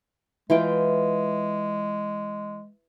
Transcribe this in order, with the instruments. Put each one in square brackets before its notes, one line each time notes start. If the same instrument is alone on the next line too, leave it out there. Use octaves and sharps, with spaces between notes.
[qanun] E3 F4 G5 [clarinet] G#3